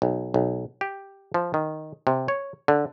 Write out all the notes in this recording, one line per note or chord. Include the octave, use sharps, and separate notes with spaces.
B1
B1
G4
F3
D#3
C3
C#5
D3